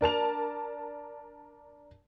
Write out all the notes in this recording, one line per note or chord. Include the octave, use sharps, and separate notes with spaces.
D4 A#4 A5 F7